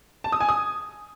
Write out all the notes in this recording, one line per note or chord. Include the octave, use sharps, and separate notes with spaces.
A5
D#6
G#5
D#6